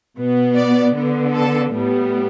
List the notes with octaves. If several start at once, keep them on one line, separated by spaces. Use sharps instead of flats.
B2 B3
D5
D3 B3
A4
A2 G3 B3